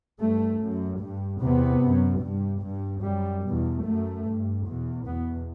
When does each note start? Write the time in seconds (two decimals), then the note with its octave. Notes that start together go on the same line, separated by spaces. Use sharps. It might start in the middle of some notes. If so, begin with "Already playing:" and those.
0.21 G2 A3
0.60 F#2
1.01 G2
1.41 E2 C3 B3
1.83 F#2
2.22 G2
2.63 G2
3.04 F#2 G3
3.44 E2 B2
3.85 F#2 A3
4.25 G2
4.67 E2 B2
5.06 E2 B2 B3